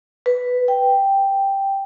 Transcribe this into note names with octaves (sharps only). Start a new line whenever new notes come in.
B4
G5